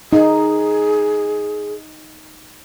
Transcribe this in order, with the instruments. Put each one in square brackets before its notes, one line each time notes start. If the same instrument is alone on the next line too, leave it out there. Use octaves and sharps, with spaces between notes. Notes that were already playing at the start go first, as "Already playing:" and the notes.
[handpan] D#4 [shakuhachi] G#4